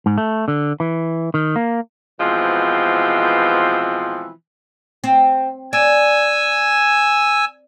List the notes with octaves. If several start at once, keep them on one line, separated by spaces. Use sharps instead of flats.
G#2
A3
D3
E3
D#3
A#3
B2 E3 F3 G#3 C4
C4
D5 G#5 E6